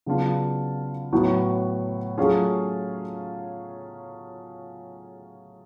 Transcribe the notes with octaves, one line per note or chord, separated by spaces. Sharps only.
C#3 F#3 B3 D4 F4
A2 F#3 B3 F#4
F#3 A3 C#4 F4 G#4